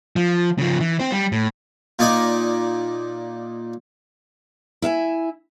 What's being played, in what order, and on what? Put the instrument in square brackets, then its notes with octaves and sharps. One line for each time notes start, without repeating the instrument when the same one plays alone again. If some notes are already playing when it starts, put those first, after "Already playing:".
[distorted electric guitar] F3
C#3 F3
E3
C4 C5
G3
A2
[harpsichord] A#2 D#4 D5 D#5 G#5
[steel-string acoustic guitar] E4 E5 F5 G#5